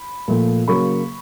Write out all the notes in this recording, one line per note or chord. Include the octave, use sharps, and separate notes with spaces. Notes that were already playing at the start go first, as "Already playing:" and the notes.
Already playing: B5
A#2 F3 A3
C#3 F#3 A#3 B5 C#6